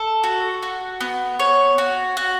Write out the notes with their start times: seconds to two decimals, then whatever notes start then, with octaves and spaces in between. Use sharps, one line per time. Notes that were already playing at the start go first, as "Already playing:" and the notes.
Already playing: A4
0.24 F#4
0.63 F#4
1.01 B3
1.39 C#5
1.78 F#4
2.17 F#4